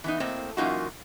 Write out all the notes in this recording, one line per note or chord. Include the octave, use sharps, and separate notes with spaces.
E3 B3 D#4
A2 A#3 C4 D#5
F#2 E3 A#3 D#4 F4 F#4